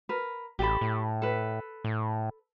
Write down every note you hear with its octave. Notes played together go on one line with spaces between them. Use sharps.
A#4 B4
A1 G4 A4 B5
A2
A4 B4
A2